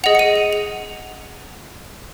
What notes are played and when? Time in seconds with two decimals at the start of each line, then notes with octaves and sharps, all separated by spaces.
0.04 G#4 D#5 F#5 F7
0.15 C#7
0.19 D#7
0.36 F7
0.53 F7